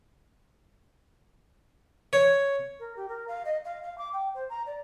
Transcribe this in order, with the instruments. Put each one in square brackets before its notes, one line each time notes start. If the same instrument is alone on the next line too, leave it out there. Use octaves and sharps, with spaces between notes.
[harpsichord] C#5
[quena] A#4
G4
A#4
F5
D#5
F5
F5
D6
G5
C5
A#5
D5